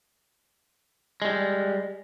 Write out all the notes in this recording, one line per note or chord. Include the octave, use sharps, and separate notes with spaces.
G3 G#3